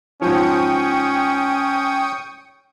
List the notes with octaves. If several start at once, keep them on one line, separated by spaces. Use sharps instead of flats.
G#2 F3 C#4 G5 C#6 D#6